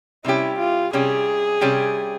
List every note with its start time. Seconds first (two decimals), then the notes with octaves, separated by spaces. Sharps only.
0.25 C3 G3 C#4 E4 G4
0.59 F4
0.93 C3 G3 C#4 G4 G#4
1.61 C3 G3 C#4 G4